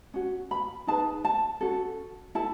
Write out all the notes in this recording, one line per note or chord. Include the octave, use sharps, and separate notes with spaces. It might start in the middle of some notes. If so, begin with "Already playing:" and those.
C#4 F#4
B5
D#4 G#4 B4 A5
A5
C#4 F#4 A4
E4 A4 A5